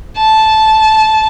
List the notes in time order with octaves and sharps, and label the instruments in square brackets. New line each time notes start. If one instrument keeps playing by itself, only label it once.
[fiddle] A5